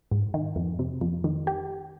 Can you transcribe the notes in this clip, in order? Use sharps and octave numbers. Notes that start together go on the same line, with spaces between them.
G#2
D#3
F2
C3
F2
D#3
G4